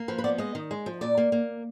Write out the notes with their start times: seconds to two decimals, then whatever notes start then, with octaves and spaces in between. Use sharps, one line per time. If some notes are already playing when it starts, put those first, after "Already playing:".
Already playing: A#3
0.08 F3 B4
0.18 B4
0.24 B3 D5
0.38 G#3 D#5
0.55 D#3
0.71 G#3
0.86 F3
1.01 A#2 D5
1.17 A#3
1.32 A#3